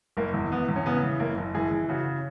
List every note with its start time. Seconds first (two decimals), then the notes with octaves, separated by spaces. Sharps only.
0.17 F#1 A#3
0.34 E2
0.51 E3 B3
0.69 E2
0.76 C#4
0.86 C#3 B3
1.03 E3
1.20 F#1 A#3
1.37 F#1
1.55 E3 G#4
1.71 E3
1.89 C#3 F#4